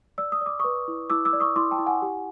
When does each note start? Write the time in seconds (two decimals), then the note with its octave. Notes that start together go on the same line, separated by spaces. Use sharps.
0.18 D5 E6
0.32 D#6
0.41 D5 D6
0.60 B4 C#6 D#6
0.88 E4
1.10 E4 D6 E6
1.25 D6 E6
1.33 D5
1.40 C#6 D#6
1.56 E4 C6 D6
1.71 G5 A5
1.79 E4
1.86 F#5 G#5
2.02 G4